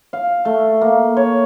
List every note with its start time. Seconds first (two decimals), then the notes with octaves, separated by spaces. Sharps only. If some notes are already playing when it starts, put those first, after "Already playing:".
0.13 F5
0.45 A3
0.81 A#3
1.17 C#5